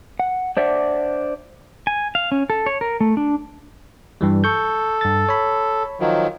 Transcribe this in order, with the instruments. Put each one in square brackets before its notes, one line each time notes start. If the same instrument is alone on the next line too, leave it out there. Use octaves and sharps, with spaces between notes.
[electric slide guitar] F#5
D4 C5 D5 E5 F#5
[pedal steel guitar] G#5
F5
C#4
A4
C#5
A#4
A3
D4
[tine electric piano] G2 E3 G3
[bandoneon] A4 [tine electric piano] C#6 G6
[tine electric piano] G2 A6
C#5 B5
[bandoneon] D#3 F3 F#3